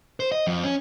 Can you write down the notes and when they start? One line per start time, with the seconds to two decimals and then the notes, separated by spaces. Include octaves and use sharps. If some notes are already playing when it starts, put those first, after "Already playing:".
0.20 C5
0.32 D#5
0.47 F2
0.64 C#4